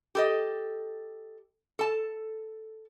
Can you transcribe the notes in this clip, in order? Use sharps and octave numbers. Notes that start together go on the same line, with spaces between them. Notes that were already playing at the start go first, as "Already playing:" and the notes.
G4 A4 D#5
A4 A5